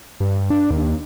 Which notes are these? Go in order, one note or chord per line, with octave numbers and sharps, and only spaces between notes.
G2
D4
D#2